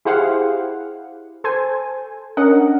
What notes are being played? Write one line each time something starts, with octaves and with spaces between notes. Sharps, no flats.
E4 G4 G#4 C5 F5 F#5
A4 C5 G#5
C#4 D4 A#4 D#5 F#5